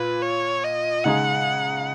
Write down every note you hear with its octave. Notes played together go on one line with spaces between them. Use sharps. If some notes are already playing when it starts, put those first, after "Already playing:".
Already playing: A#2 B4
C#5
D#5
C#3 G#3 D#4 G#4 F#5